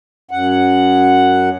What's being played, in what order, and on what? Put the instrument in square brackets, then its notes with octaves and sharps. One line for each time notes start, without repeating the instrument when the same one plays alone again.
[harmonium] F#2 F#5